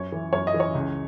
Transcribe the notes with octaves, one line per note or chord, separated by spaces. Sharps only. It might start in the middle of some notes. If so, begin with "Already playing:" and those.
Already playing: F#2 C#5
E3
F#2 C#5
D#5
E3
C#5
C#2